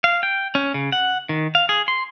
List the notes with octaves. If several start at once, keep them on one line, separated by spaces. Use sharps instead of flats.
F5
G5
C#4
C#3
F#5
D#3
F5
G#4
C6